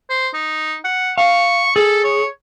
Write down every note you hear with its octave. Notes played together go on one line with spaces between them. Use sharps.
C5
D#4
F#5
F5 C#6
G#4 A4
C#5